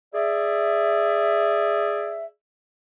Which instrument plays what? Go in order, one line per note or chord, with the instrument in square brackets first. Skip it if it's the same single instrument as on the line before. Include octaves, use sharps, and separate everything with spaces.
[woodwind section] G#4 D5 E5